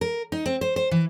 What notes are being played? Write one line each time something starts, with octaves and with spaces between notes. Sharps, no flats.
A#4
D#4
C4
C5
C5
E3